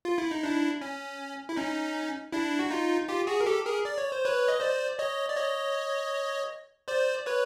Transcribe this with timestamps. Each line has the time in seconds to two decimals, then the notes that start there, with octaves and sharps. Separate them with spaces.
0.05 F4
0.18 E4
0.31 D#4
0.43 D4 E4
0.81 C#4
1.49 E4
1.56 C#4 D#4
2.32 D4 E4
2.59 F#4
2.70 D#4 F4
3.08 F4 G4
3.27 F#4 G#4
3.40 A#4
3.46 G4 A4
3.66 G#4 A#4
3.85 D5
3.98 C#5
4.12 C5
4.25 B4 C#5
4.48 D#5
4.60 C5 D5
4.99 C#5 D#5
5.29 D5
5.36 C#5 D#5
6.88 C5 D5
7.26 B4 C#5